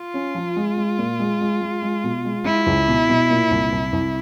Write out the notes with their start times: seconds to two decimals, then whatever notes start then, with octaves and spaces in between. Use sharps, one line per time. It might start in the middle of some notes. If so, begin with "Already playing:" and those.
Already playing: F4
0.14 C#4
0.35 F3
0.56 G#3
0.77 G#3
0.98 A#2
1.19 G#3
1.41 G#3
1.61 G#3
1.82 G#3
2.04 B2
2.24 G#3
2.45 G#3 E4
2.66 C#2
2.88 B2
3.09 B2
3.30 A#2
3.50 C2
3.72 C2
3.93 C2